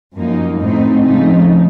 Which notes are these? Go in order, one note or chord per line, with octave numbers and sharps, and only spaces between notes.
F#2 F3 A#3 D#4
A2 A3 C4 D#4
C#3 F3 A3 D#4